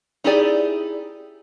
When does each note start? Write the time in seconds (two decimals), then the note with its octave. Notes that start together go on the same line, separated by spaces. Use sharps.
0.24 D#4 E4 G4 G#4 D5